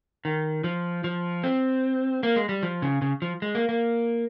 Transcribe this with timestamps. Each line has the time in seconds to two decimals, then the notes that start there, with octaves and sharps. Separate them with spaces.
0.25 D#3
0.64 F3
1.04 F3
1.44 C4
2.23 A#3
2.36 G#3
2.49 G3
2.63 F3
2.82 C#3
3.02 C#3
3.22 F3
3.42 G#3
3.55 A#3
3.69 A#3